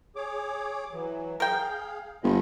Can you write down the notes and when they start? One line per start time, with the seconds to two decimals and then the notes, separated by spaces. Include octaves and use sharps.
0.16 G#4 C#5 D6
0.92 E3 F#3
1.40 G#4 A#4 F5 G5
2.23 G1 C5 D#5 B5